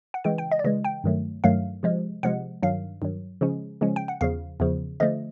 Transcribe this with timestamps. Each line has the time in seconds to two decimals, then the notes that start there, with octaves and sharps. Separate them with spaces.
0.14 F#5
0.24 C#3 E3 G#3 G5
0.38 G5
0.52 D#5
0.59 D5
0.64 C#3 E3 G#3 D#5
0.85 G5
1.04 G2 D#3 F#3 A3
1.44 G2 D#3 F#3 A3 F5
1.83 C3 F3 G#3
2.23 C3 F3 G#3 F#5
2.63 G2 D#3 F#3 F5
3.02 G2 D#3 F#3
3.41 C#3 F3 G#3 C#4
3.81 C#3 F3 G#3 C#4
3.96 G5
4.08 F#5
4.21 E2 C#3 F3 F5
4.60 E2 C#3 F3
5.00 D3 F3 A3 D#5